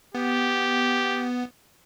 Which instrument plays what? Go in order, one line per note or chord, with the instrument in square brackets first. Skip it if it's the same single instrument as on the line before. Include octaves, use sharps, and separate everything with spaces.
[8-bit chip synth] B3 [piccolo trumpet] G4